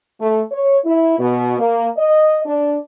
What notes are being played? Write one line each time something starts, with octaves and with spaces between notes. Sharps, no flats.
A3
C#5
E4
B2
A#3
D#5
D4